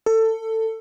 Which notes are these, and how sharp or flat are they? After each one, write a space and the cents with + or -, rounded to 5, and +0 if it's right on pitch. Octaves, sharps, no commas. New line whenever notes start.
A4 +20